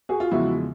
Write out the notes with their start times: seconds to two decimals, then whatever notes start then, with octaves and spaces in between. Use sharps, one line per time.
0.09 F#4 G#4
0.20 F4
0.31 E2 C#3 F3 G#3 E4 F#4